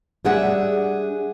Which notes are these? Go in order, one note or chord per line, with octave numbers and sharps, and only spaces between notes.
G3 D4 G#4 E5 F#5